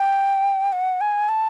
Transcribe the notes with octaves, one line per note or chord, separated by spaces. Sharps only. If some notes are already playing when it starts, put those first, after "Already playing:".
Already playing: G5
F#5
G#5
A5